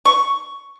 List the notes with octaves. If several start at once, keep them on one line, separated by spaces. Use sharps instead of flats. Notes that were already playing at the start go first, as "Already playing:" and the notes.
C#6